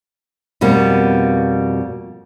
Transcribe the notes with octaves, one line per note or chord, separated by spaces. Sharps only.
F2 B2 G3 A#3 B3